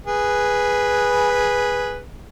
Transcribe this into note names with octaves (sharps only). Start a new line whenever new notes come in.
G#4 B4